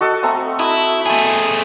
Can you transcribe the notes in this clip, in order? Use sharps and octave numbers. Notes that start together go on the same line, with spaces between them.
F#4 A4 D#5
A3 C4 A#5
E4 D#6
A3 G#4